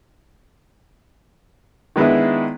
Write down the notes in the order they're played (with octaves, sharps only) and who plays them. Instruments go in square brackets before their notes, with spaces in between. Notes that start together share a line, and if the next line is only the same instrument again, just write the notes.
[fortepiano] D#3 G#3 B3 D4 E4